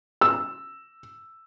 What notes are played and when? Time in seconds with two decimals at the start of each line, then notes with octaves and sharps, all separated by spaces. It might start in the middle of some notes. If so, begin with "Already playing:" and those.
0.21 E6